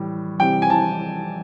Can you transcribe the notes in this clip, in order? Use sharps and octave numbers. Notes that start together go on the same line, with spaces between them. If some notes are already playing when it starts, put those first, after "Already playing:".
Already playing: A2 E3 G3
C3 E3 G3 G5
G#5
A5